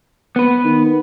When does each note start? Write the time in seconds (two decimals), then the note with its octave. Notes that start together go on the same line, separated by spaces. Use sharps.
0.36 B3 B4
0.65 D#3